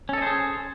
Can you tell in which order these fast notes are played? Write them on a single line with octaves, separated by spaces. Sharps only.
C#4 A4 D#5 C5 G#4